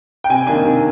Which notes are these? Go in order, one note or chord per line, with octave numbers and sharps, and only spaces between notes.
G5
C3 G#5
D#3 A#3 D4 G#5
C3